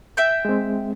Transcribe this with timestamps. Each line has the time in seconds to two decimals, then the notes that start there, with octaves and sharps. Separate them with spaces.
0.17 E5 G5 G6
0.45 G#3 C4